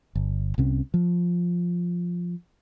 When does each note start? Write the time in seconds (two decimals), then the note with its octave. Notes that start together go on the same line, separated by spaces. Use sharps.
0.15 G1
0.58 C2 C3 C#4
0.94 F3